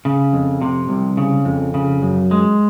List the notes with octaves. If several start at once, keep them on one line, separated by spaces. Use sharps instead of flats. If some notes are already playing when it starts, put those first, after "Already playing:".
C#3
F2
C3
C2
C#3
F2
C#3
F#2
G#3